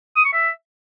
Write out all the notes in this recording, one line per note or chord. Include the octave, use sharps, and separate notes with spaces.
D#6
C#6
E5